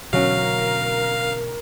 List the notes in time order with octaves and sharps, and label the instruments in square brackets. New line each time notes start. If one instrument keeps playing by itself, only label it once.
[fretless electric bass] B2 D3 E3 [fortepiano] F#3 C#4 [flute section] A#4 [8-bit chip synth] F5